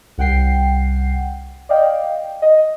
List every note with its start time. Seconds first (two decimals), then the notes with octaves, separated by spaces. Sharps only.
0.18 C2 F#5 G5 C7
1.69 D5 D#5 F5 G5
2.42 D#5